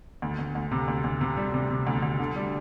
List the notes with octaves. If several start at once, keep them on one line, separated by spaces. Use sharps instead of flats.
D2
D2
D2
C3
D2
D2
C3
G3
C3
C3
D2
D2
D3
G3